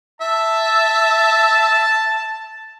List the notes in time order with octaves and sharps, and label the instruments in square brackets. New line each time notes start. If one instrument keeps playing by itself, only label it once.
[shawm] E5 [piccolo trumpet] A5